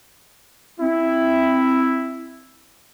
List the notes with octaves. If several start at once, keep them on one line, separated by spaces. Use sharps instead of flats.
C4 E4